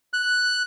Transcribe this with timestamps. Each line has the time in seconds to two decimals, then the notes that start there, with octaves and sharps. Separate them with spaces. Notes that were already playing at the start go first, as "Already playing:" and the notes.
0.13 F#6